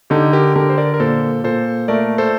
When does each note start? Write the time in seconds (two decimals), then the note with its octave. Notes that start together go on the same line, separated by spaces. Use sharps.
0.10 D3 D#4 G4
0.33 G4 A#4
0.55 D3 G4 A#4
0.70 C5
0.78 A#4 D5
0.94 A#4
1.00 A#2 A4 C5
1.44 A#2 A4 C5
1.88 A3 A#4 D5
2.18 A4 C5